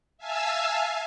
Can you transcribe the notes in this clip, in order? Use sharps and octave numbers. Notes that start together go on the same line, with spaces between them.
E5 F5 G#5 A5 E6